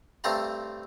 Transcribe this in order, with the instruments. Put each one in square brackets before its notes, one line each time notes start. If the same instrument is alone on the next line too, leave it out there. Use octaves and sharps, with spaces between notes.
[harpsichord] G2 A3 C4 A4 F5 A#5